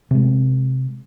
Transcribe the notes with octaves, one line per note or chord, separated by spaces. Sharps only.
C3 G#3